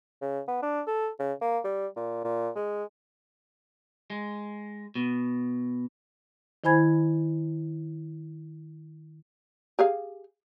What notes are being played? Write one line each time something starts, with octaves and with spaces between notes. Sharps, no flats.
C#3
B3
D4
A4
C#3
A#3
G3
A#2
A#2
G#3
G#3
B2
D#3 E4 C5 G#5 B5 G#6
G4 G#4 F5